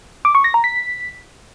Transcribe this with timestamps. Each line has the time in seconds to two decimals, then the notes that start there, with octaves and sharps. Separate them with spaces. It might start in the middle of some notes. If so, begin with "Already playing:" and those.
0.25 D6
0.35 C#6
0.44 A#6
0.54 A#5
0.64 B6